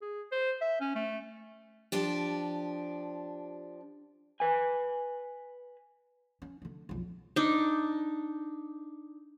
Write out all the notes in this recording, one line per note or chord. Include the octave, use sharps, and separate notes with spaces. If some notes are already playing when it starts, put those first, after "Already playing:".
G#4
C5
E5
C#4
A3
F3 D4 G4
B4 G#5
C#4
D3 A3
B1 F2
D4 D#4